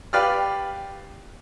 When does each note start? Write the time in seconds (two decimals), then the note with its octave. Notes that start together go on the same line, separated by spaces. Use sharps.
0.13 G4 B4 D5 F5 G5 F6